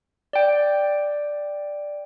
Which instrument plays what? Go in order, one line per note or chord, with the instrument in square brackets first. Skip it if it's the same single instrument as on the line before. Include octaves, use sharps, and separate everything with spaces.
[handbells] D5 G5